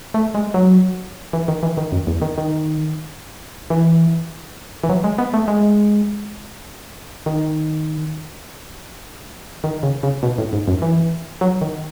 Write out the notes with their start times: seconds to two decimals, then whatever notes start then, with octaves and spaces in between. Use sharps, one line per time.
0.14 A3
0.35 G#3
0.54 F#3
1.33 E3
1.48 D#3
1.63 E3
1.77 D#3
1.92 F#2
2.07 E2
2.22 D#3
2.38 D#3
3.70 E3
4.84 E3
4.89 F#3
5.04 G#3
5.18 B3
5.34 A3
5.48 G#3
7.26 D#3
9.64 D#3
9.83 C#3
10.03 C#3
10.23 B2
10.38 A2
10.53 G#2
10.68 F#2
10.82 E3
11.41 F#3
11.61 D#3